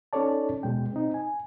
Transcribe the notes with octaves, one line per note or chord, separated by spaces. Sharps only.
C#4 D#4 A4 C#5 D5 A5
D#2 B2 G#3 G5
C4 D#4
G#5